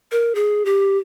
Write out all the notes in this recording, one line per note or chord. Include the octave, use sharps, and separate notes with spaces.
A#4
G#4
G4